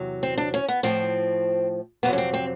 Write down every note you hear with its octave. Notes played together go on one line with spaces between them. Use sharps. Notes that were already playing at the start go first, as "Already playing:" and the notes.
Already playing: E2 C3 F#3
C4
D4
C#4
B3
A2 F3 C4
F2 C3 D#3 F#3 B3
C#4
C4
C4